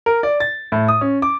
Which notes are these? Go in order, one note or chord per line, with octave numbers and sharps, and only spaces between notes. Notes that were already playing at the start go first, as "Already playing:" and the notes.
A#4
D5
A6
A2
D#6
C#4
D6